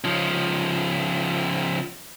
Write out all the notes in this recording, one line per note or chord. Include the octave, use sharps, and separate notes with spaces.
C#3 F3